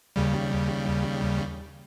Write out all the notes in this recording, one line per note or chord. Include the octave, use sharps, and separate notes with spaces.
D#2 C#3 G3